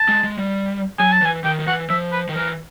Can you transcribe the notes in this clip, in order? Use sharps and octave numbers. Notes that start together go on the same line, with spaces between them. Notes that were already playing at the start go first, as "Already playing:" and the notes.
Already playing: A5
G#3
G#3
G3
F#3 G#5
A5
E3 G#5
D#3 G5
D#3
E3 F#5
F3 E5
B4
D#3
E3 A#4